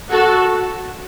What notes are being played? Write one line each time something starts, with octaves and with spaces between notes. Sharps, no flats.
F#4 A4